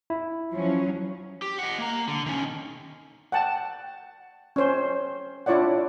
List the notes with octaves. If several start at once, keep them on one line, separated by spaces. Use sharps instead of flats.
E4
F3 F#3 C#4
G4
D#5 F#5
A#3 A#5
D3
D#3 C#4
F#5 G5 A5
C#4 C5
D4 E4 F4 C#5 D5 F#5